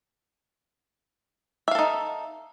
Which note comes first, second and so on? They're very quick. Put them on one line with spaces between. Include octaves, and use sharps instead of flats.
E5 F5 A4 D#4